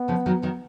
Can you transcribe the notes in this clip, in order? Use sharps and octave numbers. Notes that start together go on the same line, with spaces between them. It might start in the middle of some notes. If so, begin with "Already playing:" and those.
Already playing: B3
C#3 F3
D#3 F#3
D#3 F#3